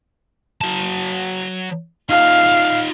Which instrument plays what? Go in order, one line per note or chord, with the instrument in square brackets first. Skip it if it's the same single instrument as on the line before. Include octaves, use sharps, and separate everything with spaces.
[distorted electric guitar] F#3 A5
[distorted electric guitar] D#4 F4 [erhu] F5